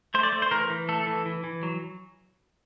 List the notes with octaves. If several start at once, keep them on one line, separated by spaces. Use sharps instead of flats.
A3 C5
D5
A3
C5
E3 A#4
E3
A3 A4
E3
E3
E3
F#3